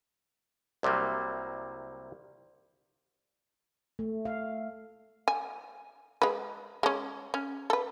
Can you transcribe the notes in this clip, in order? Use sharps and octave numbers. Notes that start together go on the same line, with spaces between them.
C2 C3 F#3 G3 A#3
A3
F5
G#5
G#3 B4
G#3 C#4
C#4
A4 B4